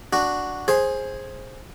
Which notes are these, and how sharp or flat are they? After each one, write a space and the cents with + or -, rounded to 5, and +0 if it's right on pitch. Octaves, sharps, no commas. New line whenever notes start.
D4 +0 F#4 +0
G#4 +0 C5 +15